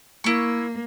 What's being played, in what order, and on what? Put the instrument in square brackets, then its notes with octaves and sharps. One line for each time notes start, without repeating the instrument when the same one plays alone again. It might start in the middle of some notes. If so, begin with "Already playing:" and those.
[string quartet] A#3 [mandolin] E4 C#6